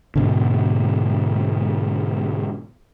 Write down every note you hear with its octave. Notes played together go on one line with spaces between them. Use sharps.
G#2 B2 D3